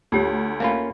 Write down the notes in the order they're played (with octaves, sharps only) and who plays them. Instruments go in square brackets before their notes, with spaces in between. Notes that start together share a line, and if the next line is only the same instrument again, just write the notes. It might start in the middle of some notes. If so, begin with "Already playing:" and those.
[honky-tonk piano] D2 [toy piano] F4 G4 C#5
[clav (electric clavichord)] A#3 C#4 F4 [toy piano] E5 B5